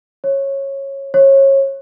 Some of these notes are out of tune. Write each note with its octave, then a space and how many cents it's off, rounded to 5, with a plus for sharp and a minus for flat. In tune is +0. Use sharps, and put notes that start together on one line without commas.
C#5 -15
C#5 -25